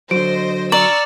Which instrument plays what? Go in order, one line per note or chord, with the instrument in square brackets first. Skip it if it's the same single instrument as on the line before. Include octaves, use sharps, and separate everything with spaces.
[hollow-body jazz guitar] D3 F#3 [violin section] C5 D#5 A#6 [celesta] D7
[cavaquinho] D5 [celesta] A#5 F#7 [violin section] C#6 E6 F6